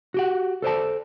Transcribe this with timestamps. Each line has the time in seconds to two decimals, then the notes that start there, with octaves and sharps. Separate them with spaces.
0.14 F#4 G4 F#5
0.62 A4 C5 D5 A5